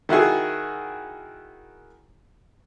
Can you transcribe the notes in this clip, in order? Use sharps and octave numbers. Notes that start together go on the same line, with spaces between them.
D#3 E4 F#4 G#4